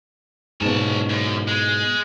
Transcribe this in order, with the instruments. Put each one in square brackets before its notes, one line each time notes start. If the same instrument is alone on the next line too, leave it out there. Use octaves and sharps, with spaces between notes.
[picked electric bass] G#2 B2 [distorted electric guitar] C#4 A5
[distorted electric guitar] F#2
G#3